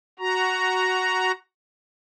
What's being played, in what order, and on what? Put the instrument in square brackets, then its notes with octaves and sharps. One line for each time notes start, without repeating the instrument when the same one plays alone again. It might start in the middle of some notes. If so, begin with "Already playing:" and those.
[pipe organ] F#4 A#5